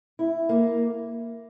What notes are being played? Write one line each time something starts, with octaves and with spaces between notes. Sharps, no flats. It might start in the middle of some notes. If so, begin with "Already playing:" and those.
E4
A#3